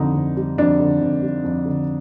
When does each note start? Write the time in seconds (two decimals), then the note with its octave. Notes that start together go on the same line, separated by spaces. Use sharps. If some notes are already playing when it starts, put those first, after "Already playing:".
Already playing: F2 D3 D#4
0.15 F2
0.37 G3
0.58 F2 D4
0.80 D3
1.01 F2
1.22 G3
1.44 F2
1.65 D3